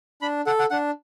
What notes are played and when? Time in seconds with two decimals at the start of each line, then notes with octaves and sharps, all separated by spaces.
0.22 D4 B5
0.46 A4 F#5
0.59 F#5
0.70 D4 F#5